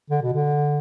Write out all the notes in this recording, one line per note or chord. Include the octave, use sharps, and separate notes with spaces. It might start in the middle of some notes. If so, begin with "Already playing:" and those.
D3
B2
D3